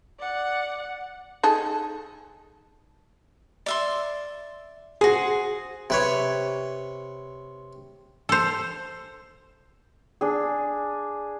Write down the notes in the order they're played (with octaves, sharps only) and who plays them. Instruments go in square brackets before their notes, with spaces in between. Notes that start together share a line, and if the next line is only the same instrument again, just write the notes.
[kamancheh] D5 F#5
[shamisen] D#4 G#4 A4
[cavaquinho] D5 E5 C6
[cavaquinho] F#4 C5 [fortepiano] G#4
[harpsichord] C3 B4 C#5
[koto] A4 C5
[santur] D4 G#4